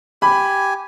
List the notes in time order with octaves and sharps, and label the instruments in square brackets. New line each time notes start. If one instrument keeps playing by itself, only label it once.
[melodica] G4 G#5 [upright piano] B5